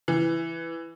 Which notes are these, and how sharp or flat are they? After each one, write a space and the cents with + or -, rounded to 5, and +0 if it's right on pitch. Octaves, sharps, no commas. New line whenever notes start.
E3 +5